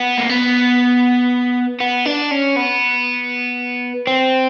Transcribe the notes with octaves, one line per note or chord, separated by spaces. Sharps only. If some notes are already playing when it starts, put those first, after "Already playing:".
Already playing: B3
A#3
B3
B3
D4
C#4
B3
C4